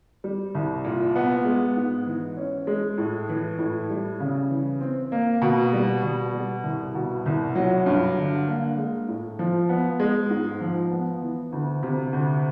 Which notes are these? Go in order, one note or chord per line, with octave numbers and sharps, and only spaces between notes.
G3
C2
A#2
B3
G#3
G#2
E3
C#4
G#3
A2
E3
A2
G3
C#3
E3
C4
A#3
B2
G3
B2
G3
C2
B2
C2
F#3
G2
D3
A#3
G#3
A2
F3
B3
G#3
G#2
F3
B3
E3
D2
C3
D2